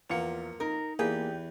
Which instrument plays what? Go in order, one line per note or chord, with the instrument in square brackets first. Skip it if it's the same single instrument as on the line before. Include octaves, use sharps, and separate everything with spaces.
[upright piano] E2 F4 C#7 [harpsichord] F3 A#3
[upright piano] D#4 [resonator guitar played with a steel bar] A#4
[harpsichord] E2 B4 [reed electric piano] A#3 G#4 [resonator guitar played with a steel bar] G4